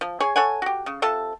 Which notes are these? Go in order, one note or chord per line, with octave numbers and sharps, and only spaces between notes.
F3
G#4 C#5 G#5
A4 C#5 F#5 G#5
F#4 G4
C#3
C3 F4 A4 A5